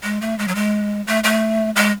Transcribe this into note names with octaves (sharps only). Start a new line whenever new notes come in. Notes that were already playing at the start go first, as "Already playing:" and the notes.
G#3
A3
G#3
F#3
G#3
A3
A3
G#3